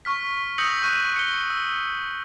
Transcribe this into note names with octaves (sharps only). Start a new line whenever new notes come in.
C#6 F6 B6
D#6 E6 G6 A#6 C#7 F#7
C#6 F#6 D#7
C#7 G7
E6